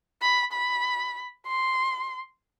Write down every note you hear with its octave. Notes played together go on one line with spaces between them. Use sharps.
B5
B5
C6